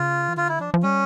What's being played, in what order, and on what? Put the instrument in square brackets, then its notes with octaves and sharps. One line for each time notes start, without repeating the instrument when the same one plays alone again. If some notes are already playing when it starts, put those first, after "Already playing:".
Already playing: [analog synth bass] C#3 [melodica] F4
[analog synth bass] E3
[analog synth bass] D3 [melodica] F4
[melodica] E4
[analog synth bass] F3 [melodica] D4
[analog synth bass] F3
[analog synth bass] G3 [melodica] C#4